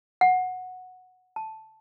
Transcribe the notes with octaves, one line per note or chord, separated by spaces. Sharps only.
F#5
A5